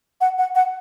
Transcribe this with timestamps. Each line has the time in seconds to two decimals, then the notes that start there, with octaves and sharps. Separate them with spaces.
0.21 F#5
0.38 F#5
0.55 F#5